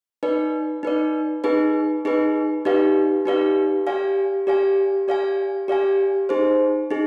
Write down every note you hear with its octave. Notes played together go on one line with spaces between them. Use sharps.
D#4 B4 D5
D#4 B4 D5
D#4 G#4 B4
D#4 G#4 B4
D#4 G4 B4 D5 F5
D#4 G4 B4 D5 F5
G4 D5 F5 G#5
G4 D5 F5 G#5
G4 D5 F5 G#5
G4 D5 F5 G#5
D#4 G#4 C5
D#4 G#4